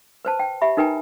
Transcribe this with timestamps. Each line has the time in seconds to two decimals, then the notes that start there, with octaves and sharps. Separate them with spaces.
0.25 B4 C5 A5
0.40 G5
0.62 G4 E5 B5
0.77 D#4 A#4 B4 G5 G#5 A#5